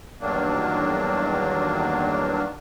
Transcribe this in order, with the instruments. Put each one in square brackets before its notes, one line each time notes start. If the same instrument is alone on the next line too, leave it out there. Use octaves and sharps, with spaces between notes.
[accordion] E2 G2 D#3 F#3 A#3 D4